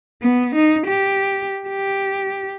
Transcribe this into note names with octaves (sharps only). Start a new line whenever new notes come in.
B3
D#4
G4
G4